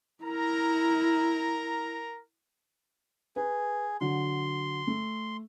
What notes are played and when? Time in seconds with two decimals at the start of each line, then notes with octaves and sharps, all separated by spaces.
0.24 E4 A#4 A#5
3.36 G#4 B4
4.01 D3 F#3 C6
4.87 A3